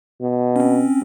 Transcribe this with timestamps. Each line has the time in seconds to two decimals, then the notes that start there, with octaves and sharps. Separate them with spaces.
0.22 B2
0.56 C4 C#4